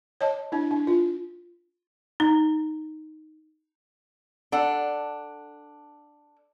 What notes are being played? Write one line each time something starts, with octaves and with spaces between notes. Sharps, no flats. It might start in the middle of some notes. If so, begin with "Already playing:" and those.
C#5 D#5 A5
D4 E4
D4
F4
D#4
D4 A4 F#5